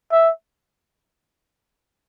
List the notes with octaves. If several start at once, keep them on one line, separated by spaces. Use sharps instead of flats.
E5